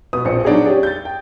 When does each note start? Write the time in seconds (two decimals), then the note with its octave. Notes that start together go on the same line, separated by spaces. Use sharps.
0.13 B2 B3 D#6
0.25 A#1 A#2 C4 C#7
0.45 F#3 B3 D4 D#4 F#4 G#4
0.65 C#4 G4 G#4 D5
0.83 G6 A6
1.05 G5